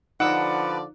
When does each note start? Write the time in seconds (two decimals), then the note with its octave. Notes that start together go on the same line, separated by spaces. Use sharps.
0.20 D3 F3 D#4 B4 D5 F#5 D6 E6